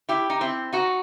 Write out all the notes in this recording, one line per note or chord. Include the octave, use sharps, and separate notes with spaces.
E4 G4
D#4
C4 E4
D#4 F#4